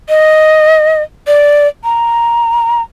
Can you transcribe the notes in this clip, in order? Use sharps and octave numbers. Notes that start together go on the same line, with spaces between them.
D#5
D5
A#5